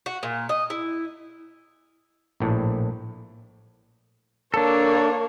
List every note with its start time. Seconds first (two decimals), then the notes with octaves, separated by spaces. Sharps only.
0.06 F#4
0.23 A#2
0.49 D#5
0.70 E4
2.40 A#1 A2
4.54 A#3 D4 A4 C#5